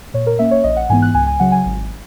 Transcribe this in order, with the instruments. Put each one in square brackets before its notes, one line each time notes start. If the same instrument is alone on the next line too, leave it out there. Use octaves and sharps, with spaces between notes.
[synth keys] A#2 C#5
A#4
A#3 C#4 E5
C#5
A#1 D#5
F#5
G#2 E3 B3 G#5
F#6
C#2 G#5
G#5
C#3 F#3 F#5
G#5
G#1